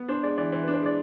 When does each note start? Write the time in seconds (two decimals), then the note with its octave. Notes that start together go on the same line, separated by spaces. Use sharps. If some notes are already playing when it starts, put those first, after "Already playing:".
Already playing: B3
0.08 D4 C5
0.23 G#3 D5
0.38 E3 D5
0.52 E3 C5
0.63 D4 B4
0.74 C5
0.82 G#3 D5